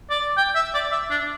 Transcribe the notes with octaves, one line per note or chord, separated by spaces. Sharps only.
D5
G5
E5
D5
E5
D4